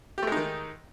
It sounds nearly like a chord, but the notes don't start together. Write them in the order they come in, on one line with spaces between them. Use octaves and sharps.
G4 A3 G#3 D#4 D#3